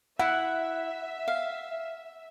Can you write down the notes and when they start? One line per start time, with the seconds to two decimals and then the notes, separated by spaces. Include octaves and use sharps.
0.19 E4 E5 F#5
1.28 F5